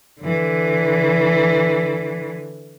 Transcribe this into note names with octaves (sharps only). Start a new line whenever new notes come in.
D3 E3